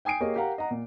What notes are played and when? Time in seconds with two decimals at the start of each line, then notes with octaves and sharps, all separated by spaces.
0.05 G5 G#5 D#6 C7 D7
0.21 A#3 G4 G#4 C#5 D#5
0.36 G4 A#4 F5 F#5 A#5
0.58 D#5 F#5 A#5
0.71 A#2